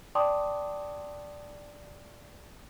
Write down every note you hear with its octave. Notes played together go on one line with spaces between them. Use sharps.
D5 G5 A5 C6 D6 D#6